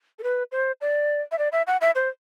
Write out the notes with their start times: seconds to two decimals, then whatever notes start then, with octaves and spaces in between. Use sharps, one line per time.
0.19 A4
0.23 B4
0.52 C5
0.81 D5
1.32 E5
1.38 D5
1.52 E5
1.67 F#5
1.81 E5
1.95 C5